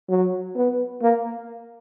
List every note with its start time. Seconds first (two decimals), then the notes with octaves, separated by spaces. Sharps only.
0.09 F#3
0.56 B3
1.02 A#3